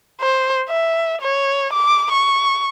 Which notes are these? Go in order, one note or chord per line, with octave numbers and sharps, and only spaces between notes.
C5
E5
C#5
D6
C#6